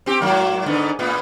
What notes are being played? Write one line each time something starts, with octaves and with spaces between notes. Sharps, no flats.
C4 G4
G#2 F#3 A#3
G#2 D3 B3
A2 B3